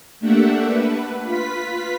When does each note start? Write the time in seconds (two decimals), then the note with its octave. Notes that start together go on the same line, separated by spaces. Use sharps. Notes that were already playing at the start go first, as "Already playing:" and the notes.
0.20 A3 A#3 D4 G4 E5 F#5
0.67 B4
1.23 F4 B4 B6